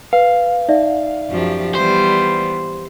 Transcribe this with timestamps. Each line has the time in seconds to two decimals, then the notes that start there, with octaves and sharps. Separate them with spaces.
0.13 B4 F5
0.69 D#4 D5 E5
1.30 F#2 F3 G4
1.75 E3 G3 B3 C5